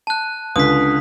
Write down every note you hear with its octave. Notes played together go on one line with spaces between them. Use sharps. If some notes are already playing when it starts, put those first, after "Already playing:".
A5 F#6
C#2 D3 D#6 B6